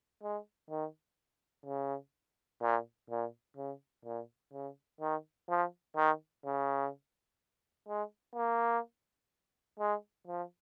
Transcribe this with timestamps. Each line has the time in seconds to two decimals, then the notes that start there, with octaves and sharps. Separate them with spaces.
0.23 G#3
0.70 D#3
1.66 C#3
2.62 A#2
3.10 A#2
3.57 C#3
4.05 A#2
4.53 C#3
5.01 D#3
5.49 F3
5.96 D#3
6.45 C#3
7.89 G#3
8.36 A#3
9.80 G#3
10.28 F3